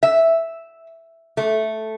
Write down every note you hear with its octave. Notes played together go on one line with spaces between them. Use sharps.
E5
A3